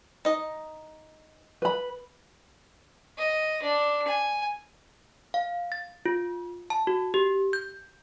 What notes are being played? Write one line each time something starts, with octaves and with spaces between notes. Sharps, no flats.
D#4 D#5
B4 B5
D#5
D4
G#5
F5
A6
F4
A5
F#4
G4
G6